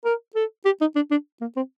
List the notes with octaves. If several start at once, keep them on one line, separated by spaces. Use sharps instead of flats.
A#4
A4
G4
D#4
D4
D4
A#3
C4